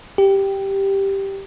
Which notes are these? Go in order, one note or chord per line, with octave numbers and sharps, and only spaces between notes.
G4